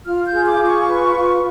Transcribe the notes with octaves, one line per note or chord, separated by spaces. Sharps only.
F4 F6
G6
G#4
D6
F4
C#6
B4
F4